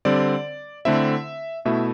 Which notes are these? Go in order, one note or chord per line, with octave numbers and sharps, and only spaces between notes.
D3 G3 C4 D5
D3 A3 C4 E4 E5
B2 A3 E4 E5